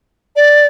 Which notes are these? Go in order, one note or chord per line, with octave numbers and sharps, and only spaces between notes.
D5